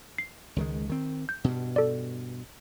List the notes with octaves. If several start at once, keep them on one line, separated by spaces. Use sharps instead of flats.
C7
C#2 D#3 G#3
D#3 C4
G6
G2 B2
A4 D5